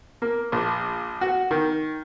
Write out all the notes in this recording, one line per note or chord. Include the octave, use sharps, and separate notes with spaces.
A#3
A#1
F#4
D#3